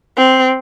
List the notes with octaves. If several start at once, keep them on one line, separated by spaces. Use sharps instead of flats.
C4